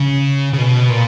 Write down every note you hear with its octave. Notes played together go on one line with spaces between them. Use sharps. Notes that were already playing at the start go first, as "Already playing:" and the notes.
Already playing: C#3
C#3
B2
A#2